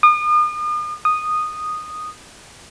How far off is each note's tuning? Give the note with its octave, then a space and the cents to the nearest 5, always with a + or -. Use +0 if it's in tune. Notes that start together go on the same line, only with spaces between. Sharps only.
D#6 -40
D#6 -10